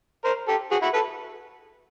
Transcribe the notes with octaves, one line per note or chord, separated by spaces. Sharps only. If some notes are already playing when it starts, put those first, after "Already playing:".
A#4 C5
G4 A4
F#4 G#4
E4 F#4
A4 B4